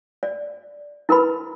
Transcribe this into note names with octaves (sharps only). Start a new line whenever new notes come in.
D5
E4 A#4 B4 B5